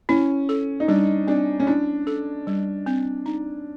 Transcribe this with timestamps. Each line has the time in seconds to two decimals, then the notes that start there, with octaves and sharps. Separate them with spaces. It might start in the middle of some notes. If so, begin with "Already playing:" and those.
0.09 C#4 E4
0.49 A4
0.80 D#4
0.88 G3 D4
1.27 C4 D4
1.60 C#4
1.67 D4 E4
2.07 A4
2.47 G3
2.86 C4
3.26 D#4